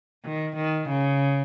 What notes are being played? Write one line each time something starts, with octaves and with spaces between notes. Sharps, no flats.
D#3
D#3
C#3